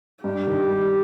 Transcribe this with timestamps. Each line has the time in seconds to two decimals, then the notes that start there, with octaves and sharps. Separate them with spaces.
0.24 G2 G4
0.47 D#3
0.70 G3